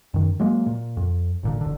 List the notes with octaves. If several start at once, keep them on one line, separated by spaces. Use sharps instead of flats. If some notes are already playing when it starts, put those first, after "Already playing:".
F#2 D#3
F#3 G#3 A#3
A#2
F2
G#1 A#2 D3
E1 D3